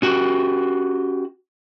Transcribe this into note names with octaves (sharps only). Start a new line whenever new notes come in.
C#4 F#4 G4